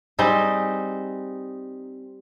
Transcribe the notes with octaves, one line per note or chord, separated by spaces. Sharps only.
G3 C4 D#4 G#4